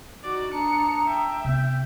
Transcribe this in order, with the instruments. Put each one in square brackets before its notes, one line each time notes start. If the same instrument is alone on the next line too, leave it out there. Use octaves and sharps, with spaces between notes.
[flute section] D#4 [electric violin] F#4 D5
[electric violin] D4 C#7 [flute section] A5 A#5 D#6
[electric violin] E5 G5
[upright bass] C3 B3 [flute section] G6